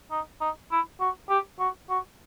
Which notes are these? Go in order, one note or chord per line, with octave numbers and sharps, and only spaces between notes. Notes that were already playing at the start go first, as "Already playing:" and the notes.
D#4
D#4
E4
F#4
G4
F#4
F#4